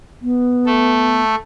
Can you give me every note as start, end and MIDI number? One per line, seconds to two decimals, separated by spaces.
0.22 1.22 59
0.66 1.36 57
0.66 1.36 69